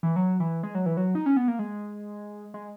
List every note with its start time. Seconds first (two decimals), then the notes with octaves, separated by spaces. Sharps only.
0.03 E3
0.16 F#3
0.40 E3
0.63 G#3
0.75 F#3
0.86 E3
0.97 F#3
1.15 D#4
1.26 C#4
1.37 B3
1.48 A#3
1.59 G#3
2.54 G#3